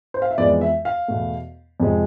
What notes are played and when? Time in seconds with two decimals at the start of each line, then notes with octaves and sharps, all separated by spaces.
0.14 C5
0.22 F5
0.31 E5
0.38 F2 E3 G#3 B3 D5
0.61 E5
0.85 F5
1.08 E2 B2 A3
1.80 F2 C3 G#3